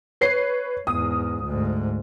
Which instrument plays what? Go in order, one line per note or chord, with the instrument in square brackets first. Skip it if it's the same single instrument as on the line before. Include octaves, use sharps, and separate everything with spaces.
[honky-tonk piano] B4 C#5 C7
[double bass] E2 G#2 [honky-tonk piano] D#6
[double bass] D2 G#2